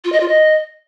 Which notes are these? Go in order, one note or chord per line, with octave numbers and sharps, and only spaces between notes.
F4
D#5
F4
D#5